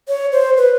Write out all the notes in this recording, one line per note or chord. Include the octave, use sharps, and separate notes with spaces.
C#5
C5
B4